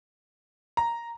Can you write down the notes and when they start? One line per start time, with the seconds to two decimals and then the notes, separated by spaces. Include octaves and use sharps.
0.77 A#5